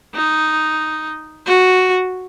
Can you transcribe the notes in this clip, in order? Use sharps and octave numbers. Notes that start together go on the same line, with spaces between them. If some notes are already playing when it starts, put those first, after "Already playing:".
D#4
F#4